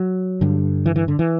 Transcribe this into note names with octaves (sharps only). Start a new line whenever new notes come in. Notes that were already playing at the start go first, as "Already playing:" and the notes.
Already playing: F#3
G2 D3
E3
E3
D3
E3